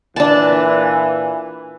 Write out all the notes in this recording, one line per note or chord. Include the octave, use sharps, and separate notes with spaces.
A#2 E3 D4 A5